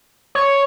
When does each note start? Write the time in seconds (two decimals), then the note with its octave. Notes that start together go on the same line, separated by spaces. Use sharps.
0.35 C#5